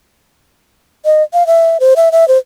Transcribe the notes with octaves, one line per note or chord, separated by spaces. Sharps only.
D#5
F5
E5
C5
E5
E5
C5